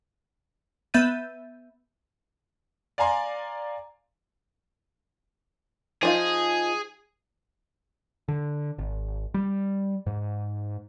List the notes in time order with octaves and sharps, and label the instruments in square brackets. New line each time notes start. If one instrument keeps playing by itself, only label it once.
[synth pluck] B3 E5 G6 A6 D#7
[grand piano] D5 F5 G#5 A#5 C6
[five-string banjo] F3 D#4 F4 [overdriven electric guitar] G#4
[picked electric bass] D3
G#1
G3
G#2